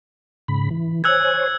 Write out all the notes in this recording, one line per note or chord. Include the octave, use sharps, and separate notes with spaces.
G#2 C#3 B5
E3
C5 C#5 G#5 E6 F#6 G#6